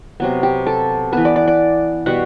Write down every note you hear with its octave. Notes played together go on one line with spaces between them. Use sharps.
C3 F#3 B3
G4
A4
E3 B3 B4
D5
D5
D5
B2 G3 B3 F#5